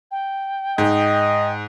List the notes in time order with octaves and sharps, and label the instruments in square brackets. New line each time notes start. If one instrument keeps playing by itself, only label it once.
[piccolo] G5
[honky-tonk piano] G#2 [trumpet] D#5